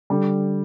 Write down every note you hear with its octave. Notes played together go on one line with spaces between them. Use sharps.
D3 G3